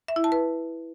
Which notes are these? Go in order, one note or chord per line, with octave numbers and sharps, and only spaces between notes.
E5
E4
A5
B4